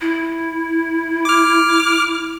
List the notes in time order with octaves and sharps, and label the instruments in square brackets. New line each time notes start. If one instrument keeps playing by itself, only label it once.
[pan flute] E4
[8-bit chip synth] D6 F6